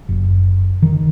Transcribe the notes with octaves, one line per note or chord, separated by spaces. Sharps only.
F#1
D#3